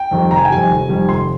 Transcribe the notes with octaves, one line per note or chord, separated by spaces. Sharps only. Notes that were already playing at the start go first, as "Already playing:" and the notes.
Already playing: G5
F2 D#3 G3
F1 A#5
G#5
G5
F2 D#3 G3 G#5
F1
F2 D#3 G3
F1 C6